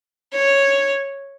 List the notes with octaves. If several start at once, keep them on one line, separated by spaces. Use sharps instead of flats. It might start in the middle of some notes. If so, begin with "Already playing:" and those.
C#5